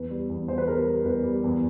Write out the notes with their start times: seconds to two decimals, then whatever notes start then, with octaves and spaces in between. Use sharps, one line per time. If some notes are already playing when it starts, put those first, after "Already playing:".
Already playing: E2 B4
0.10 G3
0.29 E2
0.48 E2 C5
0.58 B4
0.67 G3 A#4
0.86 G3
1.05 E2 B4
1.24 G3
1.44 E2